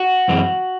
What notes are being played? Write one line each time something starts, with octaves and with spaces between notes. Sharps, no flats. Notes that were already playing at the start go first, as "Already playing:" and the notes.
Already playing: F#4
F#2 E3 G#3 C4